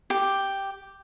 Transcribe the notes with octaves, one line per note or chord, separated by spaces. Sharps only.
G4